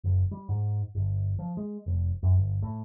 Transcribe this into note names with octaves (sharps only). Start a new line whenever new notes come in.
F#1
G3
G#2
G1
F3
G#3
F1
F#2
G1
A2